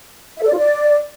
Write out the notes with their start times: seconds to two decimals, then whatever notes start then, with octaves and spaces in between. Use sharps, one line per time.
0.37 E5
0.42 A4
0.48 D5
0.53 F4
0.58 D5